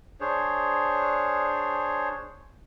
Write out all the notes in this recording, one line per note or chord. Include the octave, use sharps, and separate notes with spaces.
D4 G#4 C5 C#5